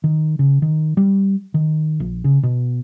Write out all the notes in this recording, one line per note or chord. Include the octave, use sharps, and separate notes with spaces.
D#3
C#3
D#3
G3
D#3
A#1
C#3
B2